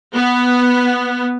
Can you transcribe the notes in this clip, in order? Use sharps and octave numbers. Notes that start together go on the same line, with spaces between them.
B3